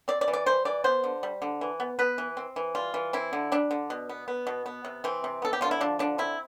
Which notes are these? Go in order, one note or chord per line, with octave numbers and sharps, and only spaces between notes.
C4 D5
D5
E3
D5
G3 C5
E3 D5
B3 C5
D3
G3
D3
E3
B3
B3 B4
E3
C4
E3
G3 F4
E3
C4 E4
D3
G3 D4
D3
B2
B3
B3
B2
B3
C3
E3 C4
C3
B3 A4
G4
D3 F4
E4
F3 D4
D3 D4
C4 E4